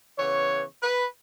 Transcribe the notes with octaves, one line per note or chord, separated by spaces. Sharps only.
C#3 E3 B3 C#5
B4